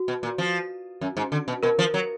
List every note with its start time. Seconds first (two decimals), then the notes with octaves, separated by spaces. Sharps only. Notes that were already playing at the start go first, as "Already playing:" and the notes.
Already playing: F#4
0.08 B2
0.23 A#2
0.38 F3
1.01 F#2
1.17 G#2
1.32 D3
1.48 B2
1.63 B2 A#4
1.79 F3
1.94 F#3